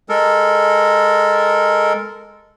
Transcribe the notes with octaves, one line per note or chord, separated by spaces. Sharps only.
G#3 A4 A#4